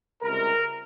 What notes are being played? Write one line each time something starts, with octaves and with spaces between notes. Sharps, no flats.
C#2 C3 G3 A#4